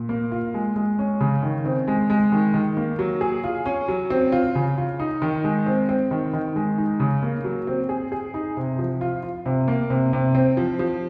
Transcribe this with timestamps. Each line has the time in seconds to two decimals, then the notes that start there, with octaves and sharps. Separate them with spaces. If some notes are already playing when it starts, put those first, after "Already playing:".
Already playing: A#2
0.09 A#3
0.32 F4
0.54 G#3
0.76 G#3
0.99 C#4
1.20 C#3
1.43 D#3
1.65 C4
1.88 G#3
2.10 G#3
2.32 D#3
2.54 D#3
2.77 A#3
2.99 F#3
3.21 G#4
3.44 F4
3.66 C#4
3.88 F#3
4.10 C4
4.32 F4
4.55 C#3
4.78 F4
5.00 D#4
5.22 D#3
5.44 G#3
5.66 C4
5.89 C4
6.11 D#3
6.33 D#3
6.56 G#3
6.78 D#4
7.00 C#3
7.23 A#3
7.44 F#3
7.67 C4
7.89 G#4
8.12 G#4
8.34 D#4
8.57 C3
8.79 F3
9.01 F4
9.23 F4
9.46 C3
9.68 A#3
9.90 C3
10.13 C3
10.35 C4
10.57 F3
10.79 F3